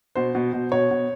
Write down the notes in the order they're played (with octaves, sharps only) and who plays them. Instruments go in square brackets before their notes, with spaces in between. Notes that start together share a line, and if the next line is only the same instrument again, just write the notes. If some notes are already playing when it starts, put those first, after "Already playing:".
[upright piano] B2 C5
B2
B2
B2 C#5
B2